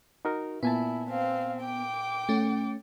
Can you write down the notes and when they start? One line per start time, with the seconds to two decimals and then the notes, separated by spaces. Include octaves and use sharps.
0.25 D#4 F#4 A#4
0.63 A#2 B3 E4 G#5 A5
1.11 C4 F5
1.60 G5 D6
2.29 A3 C#4